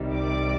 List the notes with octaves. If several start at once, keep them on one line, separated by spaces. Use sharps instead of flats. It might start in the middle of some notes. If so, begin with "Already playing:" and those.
Already playing: C2 C3 D#3 G3
D5 D6